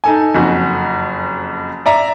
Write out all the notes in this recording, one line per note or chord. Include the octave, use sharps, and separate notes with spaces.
D#4 A4 G#5
F#1 F2 F#4
D5 E5 A#5